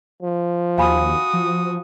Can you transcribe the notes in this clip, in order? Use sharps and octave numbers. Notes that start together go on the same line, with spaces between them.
F3
D#2 F#4 F5 G#5 B5 D#6
F3